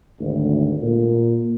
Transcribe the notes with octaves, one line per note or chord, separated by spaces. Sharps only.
G#1 D2
A#2